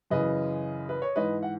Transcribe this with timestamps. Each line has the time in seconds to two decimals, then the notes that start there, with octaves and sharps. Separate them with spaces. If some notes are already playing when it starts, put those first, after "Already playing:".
0.11 F#2 C#3 E3 B4 D#5
0.89 B4
1.02 C#5
1.16 G#2 E3 B4 D#5
1.43 F#5